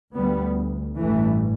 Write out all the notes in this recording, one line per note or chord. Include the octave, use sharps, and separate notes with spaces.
D2 G3 B3
A1 G2 E3 A3